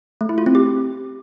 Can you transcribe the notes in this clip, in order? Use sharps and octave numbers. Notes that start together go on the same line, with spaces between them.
A3
E4
F4
C4
G4